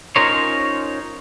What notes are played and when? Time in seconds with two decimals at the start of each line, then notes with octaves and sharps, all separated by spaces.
0.16 C#4 D#4 F4 A#4 C5 C#5